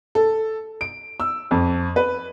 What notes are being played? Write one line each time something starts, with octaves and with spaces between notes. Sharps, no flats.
A4
D7
E6
F2
B4